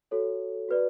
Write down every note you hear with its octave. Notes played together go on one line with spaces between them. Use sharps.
F#4 A4 C#5
F#4 B4 D5